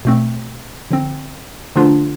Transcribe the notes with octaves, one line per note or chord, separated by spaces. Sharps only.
B2 A3 C4
D3 F3 C4
D3 F3 A3 D4 F4